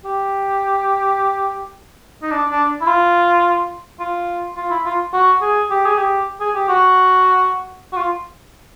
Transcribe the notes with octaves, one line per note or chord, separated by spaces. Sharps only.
G4
D#4
D4
D4
E4
F4
F4
F4
E4
F4
F#4
G#4
G4
G#4
G4
G#4
G4
F#4
F#4
F4